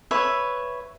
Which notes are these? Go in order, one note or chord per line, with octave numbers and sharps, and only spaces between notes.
B4 C#5 E5